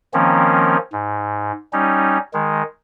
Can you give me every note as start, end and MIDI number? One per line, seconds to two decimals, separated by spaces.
0.14 0.77 51
0.14 0.77 53
0.14 0.77 58
0.14 0.77 60
0.14 0.77 61
0.92 1.52 44
1.73 2.18 55
1.73 2.18 61
1.73 2.18 63
2.33 2.63 51
2.33 2.63 56